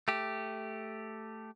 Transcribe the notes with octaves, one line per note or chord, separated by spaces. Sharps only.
A3 G4